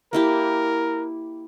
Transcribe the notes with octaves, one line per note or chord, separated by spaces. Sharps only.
A#3 E4 G4 A#4